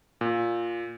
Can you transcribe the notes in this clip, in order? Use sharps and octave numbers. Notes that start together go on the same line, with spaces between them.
A#2